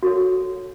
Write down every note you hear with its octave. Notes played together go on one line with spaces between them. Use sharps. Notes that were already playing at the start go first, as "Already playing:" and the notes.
F#4 A4 C#5